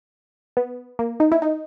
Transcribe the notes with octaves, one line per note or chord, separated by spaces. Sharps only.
B3
A#3
D#4
E4
D#4